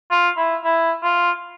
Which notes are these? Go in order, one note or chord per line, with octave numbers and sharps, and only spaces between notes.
F4
E4
E4
F4